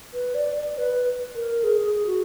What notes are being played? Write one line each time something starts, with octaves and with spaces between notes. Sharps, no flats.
B4
D5
D5
B4
A#4
G#4
F#4